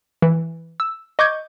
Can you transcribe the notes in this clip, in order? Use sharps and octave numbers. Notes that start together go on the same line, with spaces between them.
E3
E6
D#5 C#6 D6 G6 G#6